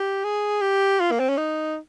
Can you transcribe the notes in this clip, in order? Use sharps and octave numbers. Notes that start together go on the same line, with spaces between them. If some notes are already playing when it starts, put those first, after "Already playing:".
Already playing: G4
G#4
G4
F4
A#3
C4
C#4
D#4